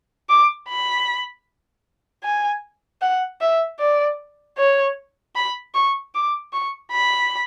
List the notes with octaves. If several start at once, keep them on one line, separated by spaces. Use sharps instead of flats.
D6
B5
G#5
F#5
E5
D5
C#5
B5
C#6
D6
C#6
B5